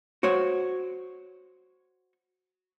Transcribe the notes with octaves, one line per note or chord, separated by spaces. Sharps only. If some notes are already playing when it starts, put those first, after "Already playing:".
F#4 C5 C#5